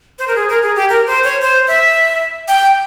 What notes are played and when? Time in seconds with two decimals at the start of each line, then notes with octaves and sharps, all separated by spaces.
0.19 C5
0.28 A#4
0.36 G#4
0.49 A#4
0.62 G#4
0.76 G4
0.89 A#4
1.07 C5
1.24 C#5
1.42 C5
1.68 E5
2.48 G5